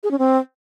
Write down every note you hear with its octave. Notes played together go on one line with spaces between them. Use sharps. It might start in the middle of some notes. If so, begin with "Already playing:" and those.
G#4
C#4
C4